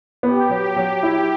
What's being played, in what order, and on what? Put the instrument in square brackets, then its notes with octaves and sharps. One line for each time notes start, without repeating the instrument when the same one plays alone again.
[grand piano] B3 [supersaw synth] G4
[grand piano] F#3
[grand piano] F#3 [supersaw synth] G4
[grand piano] E4